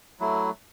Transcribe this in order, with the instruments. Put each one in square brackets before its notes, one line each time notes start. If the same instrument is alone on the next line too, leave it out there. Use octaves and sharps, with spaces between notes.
[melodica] F#3 A3 E4